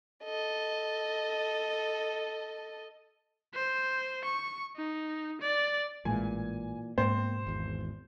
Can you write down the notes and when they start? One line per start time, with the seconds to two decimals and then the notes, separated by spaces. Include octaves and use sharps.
0.24 A4 D#5
3.54 C5
4.25 C#6
4.77 D#4
5.42 D5
6.05 A1 A#2 E3 G#3 G#5
6.98 G#2 B2 A#3 C4 C5
7.47 G#1 E2